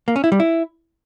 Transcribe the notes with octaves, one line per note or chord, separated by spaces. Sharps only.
A#3
C#4
E4
G3
E4